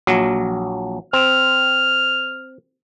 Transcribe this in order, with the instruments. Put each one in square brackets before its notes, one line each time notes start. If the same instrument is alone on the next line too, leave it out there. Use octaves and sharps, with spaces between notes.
[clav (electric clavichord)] A#1 F#3
[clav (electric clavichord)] C4 [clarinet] F6